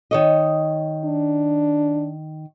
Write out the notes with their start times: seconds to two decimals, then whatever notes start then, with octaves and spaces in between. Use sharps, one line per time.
0.11 D#3 C#5 D#5
1.05 D4